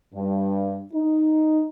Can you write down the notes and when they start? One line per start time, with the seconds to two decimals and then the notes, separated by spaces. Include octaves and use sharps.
0.14 G2
0.93 D#4